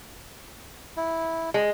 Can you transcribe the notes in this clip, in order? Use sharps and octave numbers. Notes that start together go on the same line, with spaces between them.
E4
G#3